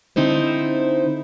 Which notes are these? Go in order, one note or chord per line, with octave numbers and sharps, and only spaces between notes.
D3 C4 D#4 E4 C5